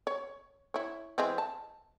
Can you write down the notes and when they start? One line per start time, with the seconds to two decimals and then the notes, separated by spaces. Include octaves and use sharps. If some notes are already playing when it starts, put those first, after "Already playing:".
0.07 C#5
0.74 E4 C#5
1.18 E3 G#3 C4
1.38 A5